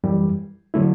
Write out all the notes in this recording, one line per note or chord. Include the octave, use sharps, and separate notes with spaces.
F#2 E3 G3
D3 F#3 A3 E4